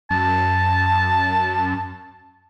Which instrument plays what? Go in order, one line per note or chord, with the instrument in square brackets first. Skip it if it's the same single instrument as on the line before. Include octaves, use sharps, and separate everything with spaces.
[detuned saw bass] F#2 [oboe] A5